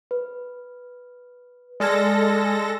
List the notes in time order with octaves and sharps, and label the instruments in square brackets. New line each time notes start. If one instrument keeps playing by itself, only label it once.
[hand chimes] B4
[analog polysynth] G#3 A4 A#6 [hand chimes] D5 F6 G#6